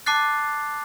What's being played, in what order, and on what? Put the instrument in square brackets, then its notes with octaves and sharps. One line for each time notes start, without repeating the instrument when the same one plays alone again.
[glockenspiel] A5 D6 F#6 A6 C7